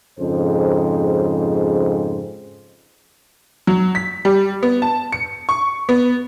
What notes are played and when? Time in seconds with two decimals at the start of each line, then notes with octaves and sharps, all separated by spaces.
0.20 F2 G#2 C#3 C5
3.67 F#3
3.95 B6
4.25 G3
4.63 B3
4.82 A5
5.12 C#7
5.49 C#6
5.89 B3